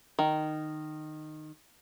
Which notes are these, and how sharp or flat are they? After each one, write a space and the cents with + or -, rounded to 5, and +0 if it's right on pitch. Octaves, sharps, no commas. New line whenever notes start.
D#3 -15